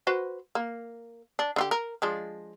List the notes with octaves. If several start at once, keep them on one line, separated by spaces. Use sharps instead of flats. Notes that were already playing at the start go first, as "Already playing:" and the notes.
F#4 B4 C5
A#3
D4
D3 F4 G4
A#4
F3 G#3 D4